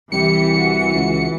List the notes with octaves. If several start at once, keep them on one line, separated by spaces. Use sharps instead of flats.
C2 E3 G4 C#7
F#4
C#2